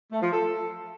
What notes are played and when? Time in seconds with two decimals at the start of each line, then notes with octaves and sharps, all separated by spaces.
0.12 A3
0.22 F3
0.32 A4